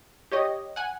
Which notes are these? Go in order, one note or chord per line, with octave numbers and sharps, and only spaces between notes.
G4 C#5 D#5
F#5 G#5